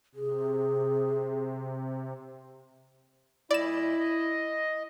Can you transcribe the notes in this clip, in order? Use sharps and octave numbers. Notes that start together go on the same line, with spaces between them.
C3 G#4
A#2 G3 E4 D5 D#5 E7
D#5